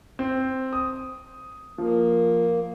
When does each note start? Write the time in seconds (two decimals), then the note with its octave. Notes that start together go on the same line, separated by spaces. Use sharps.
0.19 C4
0.73 D#6
1.78 F3 A#3